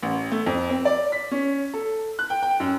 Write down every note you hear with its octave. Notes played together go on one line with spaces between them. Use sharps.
A1
A3
F2
C4
D5
B6
C#4
A4
F#6
G5
G5
F#2